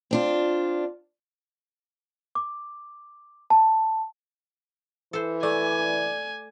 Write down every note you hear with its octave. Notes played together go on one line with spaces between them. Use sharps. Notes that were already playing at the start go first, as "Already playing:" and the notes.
C4 D4 F4
D6
A5
E3 A4 C5
A3 D5 G#5